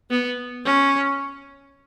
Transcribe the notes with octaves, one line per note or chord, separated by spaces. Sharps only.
B3
C#4